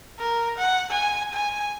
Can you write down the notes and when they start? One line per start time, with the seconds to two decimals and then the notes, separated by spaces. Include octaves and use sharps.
0.19 A#4
0.58 F#5
0.90 G#5
1.33 G#5